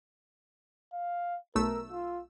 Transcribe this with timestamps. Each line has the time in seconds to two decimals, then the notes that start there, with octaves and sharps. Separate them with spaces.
0.93 F5
1.55 B1 A3 A#4 E6
1.92 F4